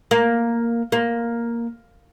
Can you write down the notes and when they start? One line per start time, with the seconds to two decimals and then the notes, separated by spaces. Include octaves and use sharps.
0.11 A#3
0.92 A#3